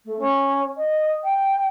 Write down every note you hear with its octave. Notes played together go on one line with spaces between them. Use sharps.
A3
C#4
D#5
G5